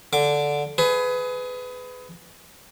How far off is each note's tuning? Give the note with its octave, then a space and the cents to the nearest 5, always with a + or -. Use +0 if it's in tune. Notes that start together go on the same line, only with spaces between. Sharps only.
D3 -5 D6 +0
G#4 +20 B4 +20